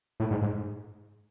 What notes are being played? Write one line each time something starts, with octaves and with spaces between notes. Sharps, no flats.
A2
G#2
G#2